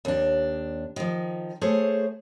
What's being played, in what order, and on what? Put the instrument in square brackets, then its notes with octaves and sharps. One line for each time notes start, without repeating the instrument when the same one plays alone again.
[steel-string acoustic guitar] D#2 D4
D#3 F3
A3 G#4 C5 C#5